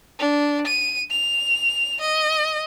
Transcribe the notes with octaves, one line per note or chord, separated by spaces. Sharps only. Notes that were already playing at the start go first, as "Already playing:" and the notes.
D4
D#7
F7
D#5